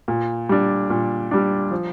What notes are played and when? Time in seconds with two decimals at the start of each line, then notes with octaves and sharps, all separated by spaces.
0.08 A#2
0.49 G3 D4
0.90 A#2
1.31 G3 D4
1.71 F3